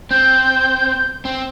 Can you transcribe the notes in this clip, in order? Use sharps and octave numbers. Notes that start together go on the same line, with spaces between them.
C4 G6
C4